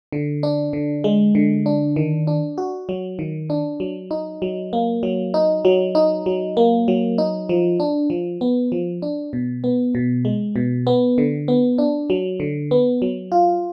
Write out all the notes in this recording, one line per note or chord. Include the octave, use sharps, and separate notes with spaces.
D3
D4
D3
G#3
D3
D4
D#3
D4
F#4
F#3
D#3
D4
F#3
D#4
F#3
A#3
F#3
D#4
F#3
D#4
F#3
A#3
F#3
D#4
F3
D4
F3
B3
F3
D4
B2
B3
B2
G#3
B2
B3
D3
B3
D4
F#3
D3
B3
F#3
F4